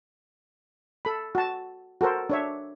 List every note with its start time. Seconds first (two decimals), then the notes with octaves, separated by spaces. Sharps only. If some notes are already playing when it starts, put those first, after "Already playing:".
1.05 A4 B5
1.35 F#4 A5
2.01 F#4 A4 A#4 C5
2.30 D4 C#5 E5